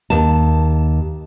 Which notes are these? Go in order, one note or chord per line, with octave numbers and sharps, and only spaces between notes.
D#2 A5